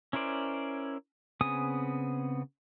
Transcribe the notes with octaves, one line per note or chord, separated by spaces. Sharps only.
C#4 E4 A#4 C5 D5
C#3 B3 C4 G#5 D#6